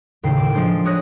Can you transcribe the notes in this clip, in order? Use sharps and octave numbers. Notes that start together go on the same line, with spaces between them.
D#2 A2 C#3 G5 C7
D6
F3 G#3 D4 C5
G#3 C#5 D#6 F#6 A#6